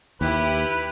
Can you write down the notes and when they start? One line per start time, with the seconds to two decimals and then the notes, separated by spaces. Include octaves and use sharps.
0.21 D#2 E4 G4 B4